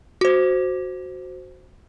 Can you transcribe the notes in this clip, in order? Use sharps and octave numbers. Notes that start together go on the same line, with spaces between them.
F#4 C5